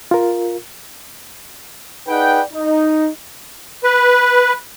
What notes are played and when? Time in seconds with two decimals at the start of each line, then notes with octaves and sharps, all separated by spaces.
0.11 F4 A#4
2.08 D#4 G#4 B4 D5 F#5 G5
2.54 D#4
3.84 B4